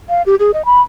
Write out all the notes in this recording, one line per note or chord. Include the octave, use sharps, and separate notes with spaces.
F5
G4
G#4
D#5
B5